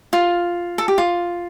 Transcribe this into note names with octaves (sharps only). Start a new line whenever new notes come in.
F4
A4
G4
F4